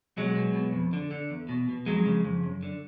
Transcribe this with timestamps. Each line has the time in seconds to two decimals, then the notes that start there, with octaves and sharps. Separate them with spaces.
0.17 B1 F#3 G#3
0.36 B2
0.54 B2
0.73 F2
0.93 D3
1.11 D3
1.31 E2
1.49 B2
1.69 B2
1.86 F2 F#3 G#3
2.06 C#3
2.25 F2
2.44 F#2
2.63 D3